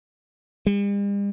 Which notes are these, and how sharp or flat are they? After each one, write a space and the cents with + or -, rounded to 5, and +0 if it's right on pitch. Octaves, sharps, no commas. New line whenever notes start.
G3 +45